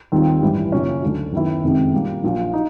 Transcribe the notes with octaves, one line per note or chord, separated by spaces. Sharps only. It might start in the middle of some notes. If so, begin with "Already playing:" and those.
D#2 D#3 G3 C4 F4
A1 G2 E3 G3
F#2 C#3 F3 A#3 C#4
D2 D3 F#3
F#2 D#3 F#3 B3 E4
F#1 F2 C3 D#3 G#3
A#2 G3 A#3
A#1 A#2 F#3
D#4